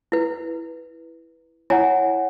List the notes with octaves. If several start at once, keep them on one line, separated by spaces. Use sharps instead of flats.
E4 B4
E4 C#5 F#5 G#5 A#5